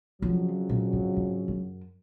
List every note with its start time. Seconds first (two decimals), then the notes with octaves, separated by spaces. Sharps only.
0.22 F2 C#3 F3 F#3
0.69 A#2
0.93 G#2
1.16 G#2
1.48 F#2